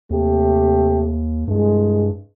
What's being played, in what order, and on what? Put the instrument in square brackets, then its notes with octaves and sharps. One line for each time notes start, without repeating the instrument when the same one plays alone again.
[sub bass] D#2 [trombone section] C3 A3 G4
[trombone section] C2 G#3 [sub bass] G2